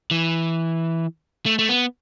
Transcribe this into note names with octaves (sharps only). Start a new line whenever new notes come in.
E3
A3
A3
B3